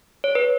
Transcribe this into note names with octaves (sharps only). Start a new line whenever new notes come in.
C#5
B4